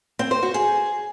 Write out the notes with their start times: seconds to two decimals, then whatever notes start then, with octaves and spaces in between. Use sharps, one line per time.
0.19 C4
0.31 C5
0.43 F#4
0.54 G#4